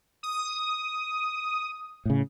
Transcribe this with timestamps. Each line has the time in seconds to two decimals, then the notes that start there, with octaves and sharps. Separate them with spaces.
0.23 D#6
2.05 A2 C#3